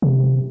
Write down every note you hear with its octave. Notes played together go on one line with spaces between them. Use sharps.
C3